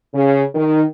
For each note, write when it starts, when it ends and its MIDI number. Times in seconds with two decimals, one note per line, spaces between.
0.13 0.42 49
0.55 0.82 51